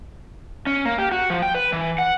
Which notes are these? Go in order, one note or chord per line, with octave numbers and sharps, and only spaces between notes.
C#4
A#3
G4
F#4
F3
G5
B4
E3
F#5